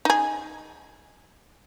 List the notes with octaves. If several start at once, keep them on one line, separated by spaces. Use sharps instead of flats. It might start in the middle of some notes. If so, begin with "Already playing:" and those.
D#4 G#4